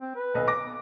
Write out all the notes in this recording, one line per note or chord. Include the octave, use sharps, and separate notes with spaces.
C4
B4
D#1 B1 D#5
D6 A#6
B3